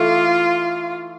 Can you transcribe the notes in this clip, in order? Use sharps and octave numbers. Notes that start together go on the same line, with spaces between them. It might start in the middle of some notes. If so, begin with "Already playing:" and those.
Already playing: E3 A3 E4 F4 A4